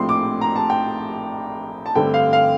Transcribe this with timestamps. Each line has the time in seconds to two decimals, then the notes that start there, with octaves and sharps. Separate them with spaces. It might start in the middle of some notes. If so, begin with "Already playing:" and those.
Already playing: A#1 A2 F3 C4 C6
0.09 D6
0.41 A#5
0.56 A5
0.70 G5
1.86 A5
1.95 G2 D3 A3 C4 G5
2.14 F5
2.33 F5